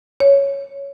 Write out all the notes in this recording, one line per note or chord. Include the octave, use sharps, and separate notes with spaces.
C#5